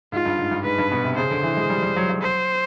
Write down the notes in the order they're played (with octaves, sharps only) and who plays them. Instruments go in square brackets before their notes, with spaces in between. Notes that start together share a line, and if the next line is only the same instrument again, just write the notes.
[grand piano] G#2 [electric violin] F4
[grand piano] G2
G#2
G2
[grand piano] G#2 [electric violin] B4
[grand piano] G2
B2
C3
[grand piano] C#3 [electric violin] C5
[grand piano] D3
E3
G#3
G3
G3
F#3
F#3
[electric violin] C5